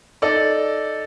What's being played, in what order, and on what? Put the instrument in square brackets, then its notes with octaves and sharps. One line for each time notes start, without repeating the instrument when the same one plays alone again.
[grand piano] D#4 A4 D5